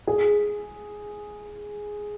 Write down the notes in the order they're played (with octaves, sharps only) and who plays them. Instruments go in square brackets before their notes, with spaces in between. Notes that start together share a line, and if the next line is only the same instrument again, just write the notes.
[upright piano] G#4